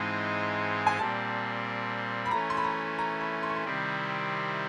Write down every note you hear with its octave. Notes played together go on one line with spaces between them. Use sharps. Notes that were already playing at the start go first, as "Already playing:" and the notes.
Already playing: G#2 E3 G#3 C4 D#4 A5
G#5
A#2 G3 C4 A5
B5
E3 A3 C#4 A#5
C6
B5
A#5
A#5
B5
C6
C#6
C6
C3 D#3 G3 C4 E4